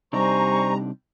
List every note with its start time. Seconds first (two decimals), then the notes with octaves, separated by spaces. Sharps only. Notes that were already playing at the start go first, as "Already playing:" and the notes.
0.13 C3 G3 D4 D#4 C5 G#5 A#5 C#6